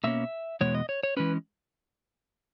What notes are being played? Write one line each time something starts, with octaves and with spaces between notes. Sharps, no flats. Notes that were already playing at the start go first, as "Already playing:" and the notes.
B2 A#3 C#4 E5
E2 B2 G#3 B3 C#5
D#5
C#5
C#5
E3 G#3 C#4 B4